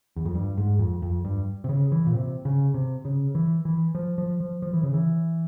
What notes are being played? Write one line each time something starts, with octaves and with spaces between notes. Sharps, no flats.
E2
F2
G2
G#2
F2
F2
G2
C3
C#3
E3
A#2
C3
C#3
C3
C#3
E3
E3
F3
F3
F3
F3
E3
C#3
E3